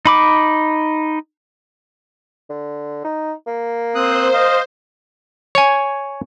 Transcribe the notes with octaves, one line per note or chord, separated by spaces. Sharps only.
D#4 B5 D6
D3
D#4
A#3
C4 C5 D#6 F#6
D#5 F5
C#5 G#5